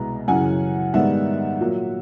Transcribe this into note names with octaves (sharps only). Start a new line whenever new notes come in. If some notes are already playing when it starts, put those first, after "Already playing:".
Already playing: C2 B2 G#3 B3 A#5
F#2 C#3 E3 F#5 G#5
G#2 D#3 G3 B3 E5 F#5
A#2 F#3 A#3